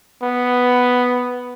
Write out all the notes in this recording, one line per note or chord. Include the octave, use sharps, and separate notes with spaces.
B3